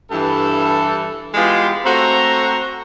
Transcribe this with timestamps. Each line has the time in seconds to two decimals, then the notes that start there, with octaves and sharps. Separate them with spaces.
0.11 G2 E3 A4
1.34 E3 G#3 B3 F4 G4 G#4
1.84 A3 C4 F#4 C5 A#5